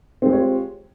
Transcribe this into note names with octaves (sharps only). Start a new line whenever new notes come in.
G#3 C4 F4 G4 C#5